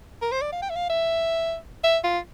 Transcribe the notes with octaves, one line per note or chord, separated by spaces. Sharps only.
A#4
C5
D5
F5
G5
E5
F5
E5
E5
F4